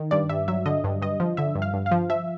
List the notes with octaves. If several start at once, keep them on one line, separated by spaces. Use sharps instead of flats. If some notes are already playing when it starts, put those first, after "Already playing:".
Already playing: D#3
G2 D5
G2 E5
F#3 E5
D3 D#5
G2
G2 D#5
F3
D3 E5
G2
F5
G2
F5
F3
F3 E5